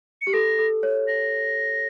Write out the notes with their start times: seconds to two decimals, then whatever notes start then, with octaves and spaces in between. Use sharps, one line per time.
0.22 C#7
0.27 G4
0.33 A4 A#6
0.59 A4
0.83 C#5
1.08 A#6